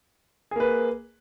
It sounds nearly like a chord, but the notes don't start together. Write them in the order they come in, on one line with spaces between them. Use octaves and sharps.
G#4 A#3 B4